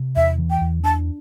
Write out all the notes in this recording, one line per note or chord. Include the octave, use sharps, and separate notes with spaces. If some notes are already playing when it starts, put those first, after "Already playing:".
Already playing: C3
E2 E5
E3
G5
E2
D4 A5